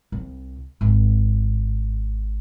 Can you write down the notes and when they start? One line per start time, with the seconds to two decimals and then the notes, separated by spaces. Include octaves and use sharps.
0.12 C2
0.81 G#1